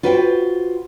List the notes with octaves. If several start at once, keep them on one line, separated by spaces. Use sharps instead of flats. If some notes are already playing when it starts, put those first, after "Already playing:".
F4 F#4 B4 C5 F#5 G5